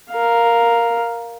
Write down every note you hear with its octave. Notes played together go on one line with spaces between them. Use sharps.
A#4 F5